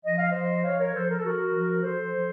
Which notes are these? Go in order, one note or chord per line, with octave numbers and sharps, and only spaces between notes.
F3 D#5
F5
F3 C5 D#5
F3 C#5 F5
A#4 C#5
F3 A4 C5
A#4
A4
F3 F#4 A#4
F3
F3 A4 C5
F3